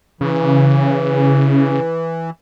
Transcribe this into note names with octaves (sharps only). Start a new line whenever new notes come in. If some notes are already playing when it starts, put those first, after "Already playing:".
C#3 E3